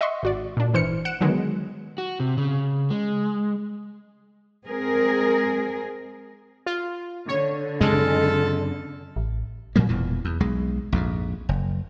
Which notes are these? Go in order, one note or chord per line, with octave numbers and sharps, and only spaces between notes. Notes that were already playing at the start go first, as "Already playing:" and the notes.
D#5 E5 F#5 C6 C#6
G#1 F#4 D5
A#2 D4
G#1 E3 C5 F6 C#7
F#5 F#6 C#7 D7 E7
D3 D#3 F#3 G#3 B3
F#4
C3
C#3
G#3
G#3 C4 G#4 A#4
F4
D3 C#5
F#2 C#3 G#3 C4 F4 A4
A1
A#2 F#3 G3 A#3
E1 E2 A#2 E3
E2
B1 G#3
A#1 F2 G#2
F#1